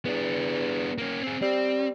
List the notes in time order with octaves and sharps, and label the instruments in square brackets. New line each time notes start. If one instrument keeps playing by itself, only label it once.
[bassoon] E2 [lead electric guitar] B3 D4
[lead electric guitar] A#3 C#4
C4 G#4
[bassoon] G3 [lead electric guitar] C4